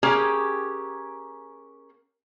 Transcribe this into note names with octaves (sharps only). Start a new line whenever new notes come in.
A#3 C#4 G4 G#4